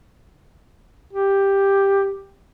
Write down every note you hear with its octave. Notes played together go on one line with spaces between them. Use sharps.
G4